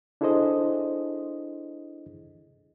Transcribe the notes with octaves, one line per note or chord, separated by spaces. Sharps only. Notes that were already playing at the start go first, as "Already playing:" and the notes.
D4 E4 G#4 A4 C5 D#5